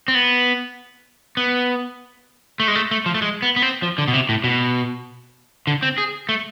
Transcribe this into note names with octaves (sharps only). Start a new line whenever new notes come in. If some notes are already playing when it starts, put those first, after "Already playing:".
C4
B3
B3
A3
G#3
A3
A3
F3
A3
G#3
B3
B3
C4
F3
D3
B2
C3
A2
B2
D3
C4
G#4
A3